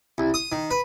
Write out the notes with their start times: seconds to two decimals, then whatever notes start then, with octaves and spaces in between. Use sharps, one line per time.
0.18 C2
0.34 D#6
0.52 D#3
0.71 B4